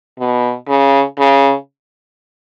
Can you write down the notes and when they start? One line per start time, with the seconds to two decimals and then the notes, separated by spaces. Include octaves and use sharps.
0.18 B2
0.68 C#3
1.18 C#3